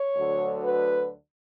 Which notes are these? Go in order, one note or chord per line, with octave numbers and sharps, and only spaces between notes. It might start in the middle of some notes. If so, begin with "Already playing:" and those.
Already playing: C#5
D2 D3 F#3
B4